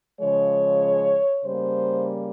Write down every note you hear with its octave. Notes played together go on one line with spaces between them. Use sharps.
C#3 F3 G#3 C#5
C#3 G3 A#3 C5